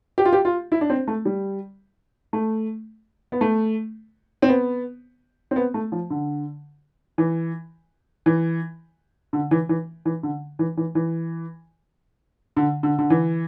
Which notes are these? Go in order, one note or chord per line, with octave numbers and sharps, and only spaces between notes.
G4
F4
G4
F4
E4
D4
C4
A3
G3
A3
B3
A3
C4
B3
C4
B3
A3
F3
D3
E3
E3
D3
E3
E3
E3
D3
E3
E3
E3
D3
D3
D3
E3